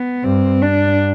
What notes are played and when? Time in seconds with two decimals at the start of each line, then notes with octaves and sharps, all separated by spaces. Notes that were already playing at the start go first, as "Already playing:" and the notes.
Already playing: B3
0.24 G2 C4
0.62 G2 D4